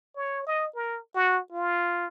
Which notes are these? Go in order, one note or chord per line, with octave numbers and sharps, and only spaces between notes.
C#5
D#5
A#4
F#4
F4